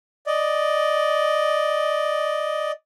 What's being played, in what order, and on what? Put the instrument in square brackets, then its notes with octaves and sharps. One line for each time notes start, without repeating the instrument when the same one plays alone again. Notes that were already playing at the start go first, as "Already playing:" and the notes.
[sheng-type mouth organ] D5 D#5